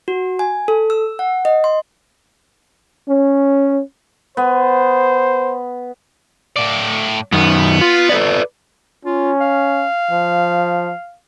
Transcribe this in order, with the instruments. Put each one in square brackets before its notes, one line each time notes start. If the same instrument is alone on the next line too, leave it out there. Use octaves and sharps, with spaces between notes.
[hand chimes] F#4
G#5
A4
E6
F#5
D#5
C6
[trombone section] C#4
[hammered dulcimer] B3 [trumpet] C5
[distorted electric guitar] A2 D5
[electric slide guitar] F#2 D#3 [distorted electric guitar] B3
[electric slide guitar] F4
A4 B4 D5
[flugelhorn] C#4 [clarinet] F4
[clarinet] F5
[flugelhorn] F3